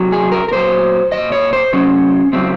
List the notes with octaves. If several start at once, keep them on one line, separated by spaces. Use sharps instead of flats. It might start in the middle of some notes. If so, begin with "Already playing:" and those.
Already playing: C3 F#3
G#4
A#4
A#4
A#2 F#3 C5
A#2 F3 D#5
C#5
C5
C3 F#3 C#4
C#3 F#3 C4